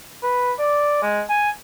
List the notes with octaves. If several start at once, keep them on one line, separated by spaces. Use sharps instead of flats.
B4
D5
G#3
G#5